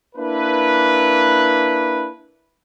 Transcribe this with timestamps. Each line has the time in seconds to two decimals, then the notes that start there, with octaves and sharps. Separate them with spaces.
0.15 A#3 D4 E4 B4